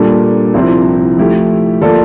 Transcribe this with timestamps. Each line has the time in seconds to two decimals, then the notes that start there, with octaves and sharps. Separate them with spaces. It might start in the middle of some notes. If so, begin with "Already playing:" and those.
Already playing: A#2 G3 A#3 D4 A4
0.54 C2 C3 F3 C4 E4
1.18 F3 A3 E4 G4
1.81 F3 A#3 F4 A4 D5